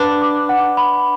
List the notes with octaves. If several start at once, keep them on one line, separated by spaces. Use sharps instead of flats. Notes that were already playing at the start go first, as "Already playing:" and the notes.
Already playing: D4 B4 F#5 B5
D6
F#5
B5